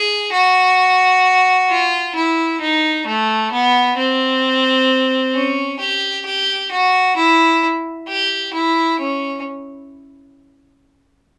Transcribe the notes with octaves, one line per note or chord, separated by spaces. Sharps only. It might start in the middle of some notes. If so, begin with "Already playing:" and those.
Already playing: G#4
F#4
F4
E4
D#4
A3
B3
C4
C#4
G4
G4
F#4
E4
G4
E4
C#4